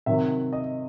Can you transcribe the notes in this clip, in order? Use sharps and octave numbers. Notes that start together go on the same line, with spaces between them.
C3 D#3 F#3 E5
D#5